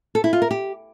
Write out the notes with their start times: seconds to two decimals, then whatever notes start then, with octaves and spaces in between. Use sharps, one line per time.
0.15 A4
0.24 E4
0.33 F4
0.42 A#4
0.51 G4